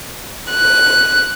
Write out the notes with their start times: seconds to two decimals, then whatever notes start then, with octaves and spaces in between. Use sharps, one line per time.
0.51 F#6